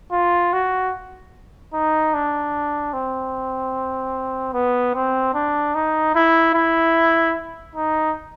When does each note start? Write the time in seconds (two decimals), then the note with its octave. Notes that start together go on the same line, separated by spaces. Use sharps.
0.12 F4
0.53 F#4
1.73 D#4
2.14 D4
2.93 C4
4.54 B3
4.94 C4
5.34 D4
5.75 D#4
6.15 E4
6.54 E4
7.76 D#4